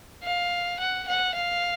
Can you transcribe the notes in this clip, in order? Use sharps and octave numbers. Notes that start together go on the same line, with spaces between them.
F5
F#5
F#5
F5